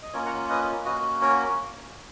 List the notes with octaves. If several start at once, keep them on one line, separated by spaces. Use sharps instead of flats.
D#5
A#3 C#4 F4 A#4 C#5
F#5 A#5
B4 D#5
A#3 C#4 F#4 B4 D#5
A#4 C#5